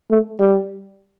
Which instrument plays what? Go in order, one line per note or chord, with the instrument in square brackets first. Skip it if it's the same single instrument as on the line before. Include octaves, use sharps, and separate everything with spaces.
[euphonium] A3
G3